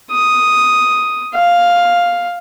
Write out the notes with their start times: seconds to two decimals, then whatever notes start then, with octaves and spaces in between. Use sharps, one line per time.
0.12 D#6
1.35 F5